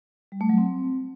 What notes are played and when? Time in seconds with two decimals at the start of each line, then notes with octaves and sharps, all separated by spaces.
0.32 G3
0.41 A3
0.49 F#3
0.58 C4